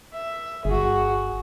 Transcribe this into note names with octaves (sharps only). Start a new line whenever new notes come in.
E5
G1 F#4 G#4